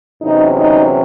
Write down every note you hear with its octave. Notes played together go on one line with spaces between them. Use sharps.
E2 C3 F#3 C#4 D#4
D#4